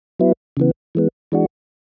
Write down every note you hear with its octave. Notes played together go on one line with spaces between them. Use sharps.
F#3 B3 E4
C#3 E3 B3
E3 G#3 B3
E3 G#3 D4 F#4